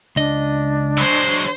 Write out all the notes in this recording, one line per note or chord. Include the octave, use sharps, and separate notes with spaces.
C#2 D4 D#5
F#3 G#3 C5